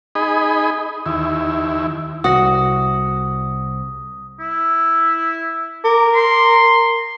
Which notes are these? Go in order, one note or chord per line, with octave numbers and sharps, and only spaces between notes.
D#4 G#4 D#5 B5
D#2 E4
C2 F#4 D#6 A#6
E4
A#4 D6
C6